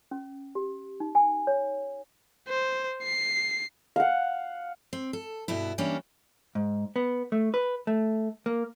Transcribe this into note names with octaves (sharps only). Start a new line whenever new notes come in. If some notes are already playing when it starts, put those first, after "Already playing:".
C#4
G4
D#4
G#5
C#5
C5
C7
F5 F#5
C4
A4
G2 B2 B3 E4
E3 G3 A#3 C#4 D4
G#2
B3
A3
B4
A3
A#3